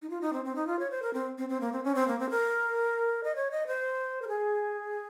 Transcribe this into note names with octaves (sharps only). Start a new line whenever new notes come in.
D#4
F4
D#4
C4
C4
D#4
F4
C#5
C5
A#4
C4
C4
C4
A#3
C4
C#4
C4
A#3
C4
A#4
D#5
C#5
D#5
C5
A#4
G#4